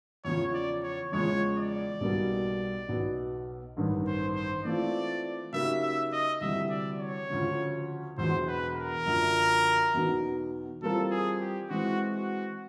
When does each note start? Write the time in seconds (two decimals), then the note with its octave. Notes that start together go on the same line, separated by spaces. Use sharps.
0.24 E2 C#3 F3 C#5
0.54 D5
0.83 C#5
1.12 E2 C#3 F3 G#3 C#5
1.57 D5
2.01 B1 B2 G3 A#3
2.88 B1 B2 F#3 B3
3.77 A1 G2 D#3
4.07 C5
4.35 C5
4.64 E3 A3 C4 F4 D5
5.53 C#3 F#3 A#3 D#4 G4 E5
5.82 E5
6.12 D#5
6.41 D2 C3 E3 G3 E5
6.70 D5
7.00 C#5
7.30 D2 C#3 F3
8.18 E1 E2 B2 F#3 C5
8.48 B4
8.76 A#4
9.06 F#2 D3 F3
9.94 E2 B2 F#3 B3 D#4
10.82 E3 G3 C4 F4 A4 A#4
11.11 G#4
11.40 G4
11.70 E3 G#3 C4 F#4
12.15 F#4